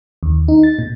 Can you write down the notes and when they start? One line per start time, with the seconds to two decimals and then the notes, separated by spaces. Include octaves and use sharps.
0.23 D#2
0.48 D#4
0.63 A6
0.79 A#2